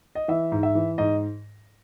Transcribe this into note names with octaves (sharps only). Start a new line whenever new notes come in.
D#5
E3 E5
G#2
E5
E3
G#2 D#5